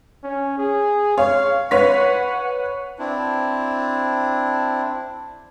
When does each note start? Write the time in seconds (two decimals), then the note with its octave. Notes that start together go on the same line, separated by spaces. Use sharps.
0.24 C#4
0.58 G#4
1.18 C#5 F5
1.71 B4 C#5 F#5 B6
2.99 C4 D4 E4